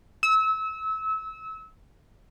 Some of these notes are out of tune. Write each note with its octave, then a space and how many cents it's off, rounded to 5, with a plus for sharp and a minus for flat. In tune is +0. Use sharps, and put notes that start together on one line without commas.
E6 -30